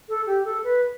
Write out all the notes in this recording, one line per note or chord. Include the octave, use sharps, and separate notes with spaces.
A4
G4
A4
B4